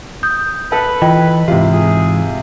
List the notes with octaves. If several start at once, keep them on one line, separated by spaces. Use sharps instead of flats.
D#6 G6
A4 B4
E3 F4 D#5 G5
G#2 C3 E3 F4 G4
G#4